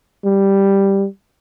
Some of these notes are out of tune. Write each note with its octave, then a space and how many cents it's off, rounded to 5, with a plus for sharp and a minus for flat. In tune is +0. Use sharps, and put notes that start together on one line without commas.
G3 +0